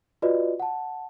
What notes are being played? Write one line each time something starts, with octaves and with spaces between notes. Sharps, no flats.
F4 F#4 B4 D5 D#5
F#5 A5